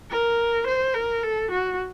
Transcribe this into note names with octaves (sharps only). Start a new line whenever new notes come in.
A#4
C5
A#4
A4
F#4